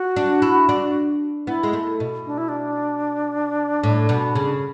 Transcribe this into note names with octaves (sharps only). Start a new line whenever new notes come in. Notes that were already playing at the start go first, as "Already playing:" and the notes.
Already playing: F#4
D4
E4
D4
B3 E4
G#3
A3
B2
D4
E4
D4
A2
B2
C#3